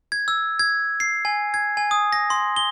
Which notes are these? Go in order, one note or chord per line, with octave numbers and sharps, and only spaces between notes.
G#6
E6
G#6
C7
G#5
G#6
G#5
D#6
A#6
C6
G7